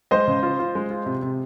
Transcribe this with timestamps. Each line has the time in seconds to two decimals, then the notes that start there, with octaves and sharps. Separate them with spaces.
0.11 G#3 C5 D#5
0.28 C#3
0.43 F4
0.59 F4
0.75 G#3
0.90 F4
1.06 C3
1.22 C3